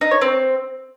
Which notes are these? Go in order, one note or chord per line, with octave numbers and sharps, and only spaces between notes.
D#4
C#5
C4